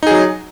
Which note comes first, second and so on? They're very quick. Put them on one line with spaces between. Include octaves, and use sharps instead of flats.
D#4 G#4 F#3